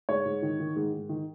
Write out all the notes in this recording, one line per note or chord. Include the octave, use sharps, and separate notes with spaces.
G#2 C#5
G#2
D#3
D#3
G#2
G#2
D#3